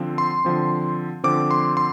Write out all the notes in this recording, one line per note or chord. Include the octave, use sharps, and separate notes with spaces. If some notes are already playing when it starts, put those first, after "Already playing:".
Already playing: D3 F3 C4
C6
D3 F3 C4
D3 F3 C4 D6
C6
C6